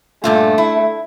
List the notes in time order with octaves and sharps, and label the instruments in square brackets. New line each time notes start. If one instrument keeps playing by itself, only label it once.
[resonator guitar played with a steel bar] G2 A#2 F4 [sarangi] A3
[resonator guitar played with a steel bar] E4